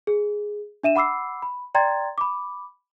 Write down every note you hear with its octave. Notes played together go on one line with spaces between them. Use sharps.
G#4
D4 E5 D#7 E7
F#5 B5 D6 E6 C7
B5
D5 G5 A#5 C6 G#6 A6
B5 D6